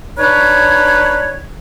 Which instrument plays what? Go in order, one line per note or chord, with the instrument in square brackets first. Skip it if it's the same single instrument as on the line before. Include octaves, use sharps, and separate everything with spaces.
[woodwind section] D4 D#4 B4 C#5